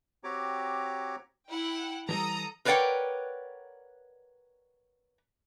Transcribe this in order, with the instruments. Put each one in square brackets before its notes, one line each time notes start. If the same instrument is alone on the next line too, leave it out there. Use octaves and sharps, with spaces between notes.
[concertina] C4 F#4 G4 C#5 A#5 D6
[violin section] E4 F#5 G5
[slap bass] E3 F3 G3 [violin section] A4 A#5 D#6
[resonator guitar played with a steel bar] A#4 B4 C#5 D5 F#5 G5